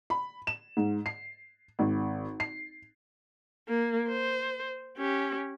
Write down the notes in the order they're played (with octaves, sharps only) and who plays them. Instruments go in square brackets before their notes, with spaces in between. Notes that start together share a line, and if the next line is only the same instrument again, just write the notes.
[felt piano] B5
E7
G#2
C7
G#1
C7
[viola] A#3
C5
C#4 G4